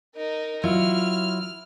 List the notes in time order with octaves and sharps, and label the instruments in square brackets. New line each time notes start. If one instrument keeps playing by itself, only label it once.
[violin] D#4 A#4
[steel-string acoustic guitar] F#3 E4 F4 [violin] F6